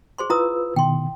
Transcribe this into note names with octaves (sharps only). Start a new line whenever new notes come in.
G#4 C5 C6
E4 F4 B4 A#5 D#6 E6
B2 D#3 G5 C6